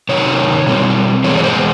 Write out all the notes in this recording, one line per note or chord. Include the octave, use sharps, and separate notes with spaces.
C3 D#3 F#3 C#5
B2 G3 C4
E3 G#3 B3 C#5
C#5
C5